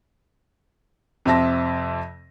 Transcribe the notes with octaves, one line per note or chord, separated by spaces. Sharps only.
F2 C3 C4 E5 A5 A#6